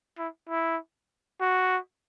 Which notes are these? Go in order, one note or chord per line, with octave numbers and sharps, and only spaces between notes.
E4
E4
F#4